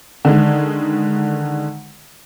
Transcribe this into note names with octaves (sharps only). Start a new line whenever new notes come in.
D3 D#3 G#3